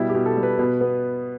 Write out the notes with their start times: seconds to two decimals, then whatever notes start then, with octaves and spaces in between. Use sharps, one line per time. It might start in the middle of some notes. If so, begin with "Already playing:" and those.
Already playing: B2 G3 E4
0.09 G4
0.14 B2
0.26 A4
0.37 G3
0.43 B4
0.59 B2
0.81 B3